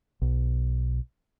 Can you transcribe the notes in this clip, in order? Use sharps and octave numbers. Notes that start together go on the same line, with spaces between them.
B1